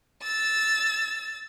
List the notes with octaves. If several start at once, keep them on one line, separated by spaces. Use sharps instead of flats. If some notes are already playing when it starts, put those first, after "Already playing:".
E6 A6